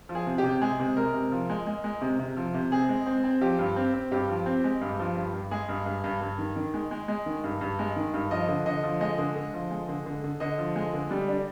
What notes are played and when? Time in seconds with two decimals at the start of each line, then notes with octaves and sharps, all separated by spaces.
0.09 F3
0.15 G#4
0.26 C3
0.38 G4
0.44 C3
0.62 G#3 G#4
0.79 C3
0.97 G#3 A#4
1.14 C3
1.31 F3
1.50 G#3
1.67 G#3
1.84 G#3
2.01 C3
2.19 C3
2.37 F3
2.54 C3
2.71 C4 G#4
2.89 G#3
3.06 C4
3.24 C4
3.41 F3 G4
3.59 G2
3.76 C4
3.94 C4
4.11 G2 G4
4.29 F3
4.46 C4
4.64 G#3
4.81 G2
4.99 F3
5.16 G2
5.34 G2
5.51 G#3 G#4
5.69 G2
5.86 G2
6.04 G2
6.21 G2
6.38 D#3
6.56 D#3
6.74 G#3
6.91 G#3
7.08 G#3
7.26 D#3
7.44 G2
7.61 G2
7.79 G#3
7.96 D#3
8.14 G2
8.31 F3 D#5
8.48 D3
8.66 D3 D#5
8.83 F3
9.01 G#3 D#5
9.18 D3
9.36 D3
9.54 F3
9.71 G#3
9.89 D3
10.06 D3
10.24 D3
10.40 D3 D#5
10.58 F3
10.76 G#3
10.94 D3
11.11 G3
11.28 D4